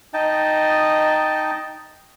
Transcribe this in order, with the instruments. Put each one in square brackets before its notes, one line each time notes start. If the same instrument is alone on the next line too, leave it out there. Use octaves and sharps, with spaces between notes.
[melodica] D#4 D#5 G5 A5